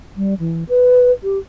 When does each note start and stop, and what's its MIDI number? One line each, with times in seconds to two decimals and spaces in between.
0.17 0.34 55
0.39 0.64 52
0.69 1.12 71
1.24 1.38 67